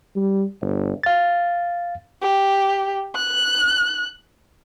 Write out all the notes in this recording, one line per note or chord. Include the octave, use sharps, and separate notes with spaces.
G3
G1
F5 A6
G4
F#6